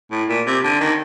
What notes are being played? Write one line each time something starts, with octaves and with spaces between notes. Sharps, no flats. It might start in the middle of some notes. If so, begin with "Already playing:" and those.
A2
A#2
C3
D3
D#3